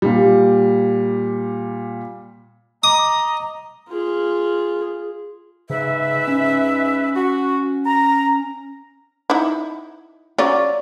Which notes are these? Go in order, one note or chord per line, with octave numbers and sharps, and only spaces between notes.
A#2 G3
D#5 A#5 D6 D#6
F4 G#4
G#2 C#3 B4 E5
C#4
F#4
A#5
D#4 E4
F#3 C#4 F4 D5